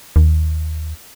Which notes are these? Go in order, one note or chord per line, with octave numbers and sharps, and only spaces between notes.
D#2